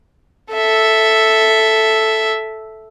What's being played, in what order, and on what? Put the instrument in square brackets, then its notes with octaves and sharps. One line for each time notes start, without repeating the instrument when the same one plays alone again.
[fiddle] A4 E5